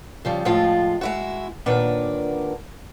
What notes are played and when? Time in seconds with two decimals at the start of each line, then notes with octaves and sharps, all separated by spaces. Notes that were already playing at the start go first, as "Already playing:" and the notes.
0.25 C#3 F3 G3
0.45 A2 F3 G#3 F4
1.01 G#3 E4 F#4
1.66 D#2 A#2 D4 A#4 B4 F#5